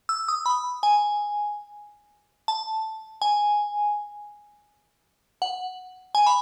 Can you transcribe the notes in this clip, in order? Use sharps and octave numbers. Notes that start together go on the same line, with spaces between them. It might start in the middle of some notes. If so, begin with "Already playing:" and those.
E6
D#6
B5
G#5
A5
G#5
F#5
G#5
B5